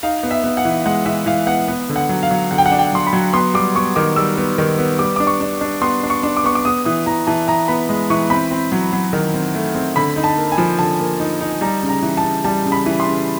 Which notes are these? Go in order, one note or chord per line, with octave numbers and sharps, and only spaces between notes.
D#4 F5
B3
E5
B3
F#5
E3
G#3 F#5
E3 E5
E3 F5
B3 F#5
B3
D3
F#5
F#3
F5
F#3
D3 F#5
G5
F#5
D4
G5
F#3 C6
B5
F#3
B3 C6
G3 D6
B3 C#6
D#3 D6
G3 E6
B3
D#3
B3
G3 D6
D4 D6
C#6
D4
D4
B3 C6
D4
C#6
D4
D6
B3 C#6
D6
B3 D#6
E3 D#6
E3 A#5
E3 A5
E3 A#5
B3 B5
G#3
E3 C#6
C4 B5
C4
F#3
F#3
D#3
C4
A3
C4
D3 B5
D#4
A5
A#3
G#5
F3
D3 A5
A#3
D#4
D#4
G3 A#5
C#3
A#5
E3
A5
C#3
G3 A5
C#3
B5
E3
C6
C#3